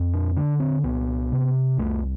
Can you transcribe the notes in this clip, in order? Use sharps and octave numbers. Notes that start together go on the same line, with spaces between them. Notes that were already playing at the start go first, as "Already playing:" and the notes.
Already playing: F2
D4
D3 D4
C4
C2 B3
C3
C2 A3